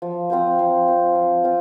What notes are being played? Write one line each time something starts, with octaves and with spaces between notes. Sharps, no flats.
F3
C4 F4 C5
F3
C4 F4 C5
F3
C4 F4 C5